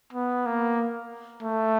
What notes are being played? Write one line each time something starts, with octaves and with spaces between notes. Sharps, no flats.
B3
A#3
A3